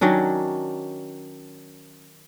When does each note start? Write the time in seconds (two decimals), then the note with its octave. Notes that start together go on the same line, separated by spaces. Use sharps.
0.01 D#3 F#3 C#4 D4